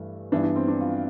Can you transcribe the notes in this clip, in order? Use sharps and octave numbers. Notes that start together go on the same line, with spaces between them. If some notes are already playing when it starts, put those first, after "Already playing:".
Already playing: G2 E3 A3
G2 E3 B3 D4
D4
C4
D4
F4